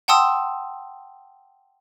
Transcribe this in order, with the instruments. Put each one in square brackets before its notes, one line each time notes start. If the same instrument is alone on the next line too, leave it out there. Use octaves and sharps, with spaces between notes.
[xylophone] F#5 G5 A5 C6 D#6 E6